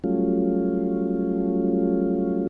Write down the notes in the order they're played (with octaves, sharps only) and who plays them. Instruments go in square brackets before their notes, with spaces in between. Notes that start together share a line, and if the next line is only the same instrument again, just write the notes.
[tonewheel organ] F#3 G3 A3 C#4 F4